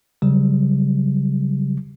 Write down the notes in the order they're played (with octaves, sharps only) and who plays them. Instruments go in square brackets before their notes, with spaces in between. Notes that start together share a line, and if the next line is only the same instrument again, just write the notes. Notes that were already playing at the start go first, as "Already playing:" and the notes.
[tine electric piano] C#3 F#3 G3